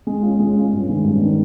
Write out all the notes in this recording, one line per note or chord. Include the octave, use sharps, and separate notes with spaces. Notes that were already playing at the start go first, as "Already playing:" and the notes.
G#3
C#4 F4
G#3
C#4 F4
G2
D#3 G#3 C#4
G2
D#3 G#3 C#4